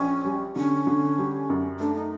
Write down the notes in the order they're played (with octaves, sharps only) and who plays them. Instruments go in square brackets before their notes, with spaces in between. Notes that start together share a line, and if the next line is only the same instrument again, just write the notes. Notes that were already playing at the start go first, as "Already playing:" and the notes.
Already playing: [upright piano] A#1 [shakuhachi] C#4
[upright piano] G3
[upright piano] D3 [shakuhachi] C#4
[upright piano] D3
G3
F#2
[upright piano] A3 [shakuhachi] D4
[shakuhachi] D#4